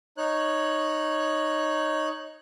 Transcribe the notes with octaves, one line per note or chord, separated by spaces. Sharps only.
D#4 C#5 F#6